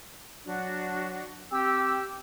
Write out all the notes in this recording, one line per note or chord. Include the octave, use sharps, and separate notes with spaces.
F#3 D4 F#4
C4 G4 E6